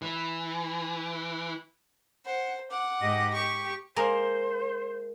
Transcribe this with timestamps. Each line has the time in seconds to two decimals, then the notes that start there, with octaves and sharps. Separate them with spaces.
0.02 E3
2.25 C5 F#5
2.71 F#5 D6
3.00 G#2 G4 D#5
3.34 G4 C#6
3.96 G#3 A#3 A#4 C5